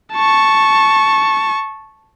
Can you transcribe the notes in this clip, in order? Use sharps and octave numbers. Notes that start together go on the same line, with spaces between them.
A5 C#6